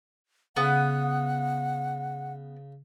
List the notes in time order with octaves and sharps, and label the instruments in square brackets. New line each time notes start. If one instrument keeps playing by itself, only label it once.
[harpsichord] C#3 [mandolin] B3 [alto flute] F#5